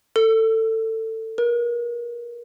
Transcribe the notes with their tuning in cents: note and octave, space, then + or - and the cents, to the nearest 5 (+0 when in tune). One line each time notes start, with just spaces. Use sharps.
A4 +20
A#4 +35